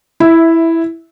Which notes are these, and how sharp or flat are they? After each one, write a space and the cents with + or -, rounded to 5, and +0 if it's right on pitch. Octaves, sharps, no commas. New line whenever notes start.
E4 +0 E5 -15